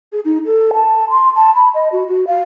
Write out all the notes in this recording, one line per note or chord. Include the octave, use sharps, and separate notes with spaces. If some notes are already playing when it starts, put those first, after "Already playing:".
G#4
D#4
A4
A5
C6
A5
B5
D#5
F#4
F#4
F5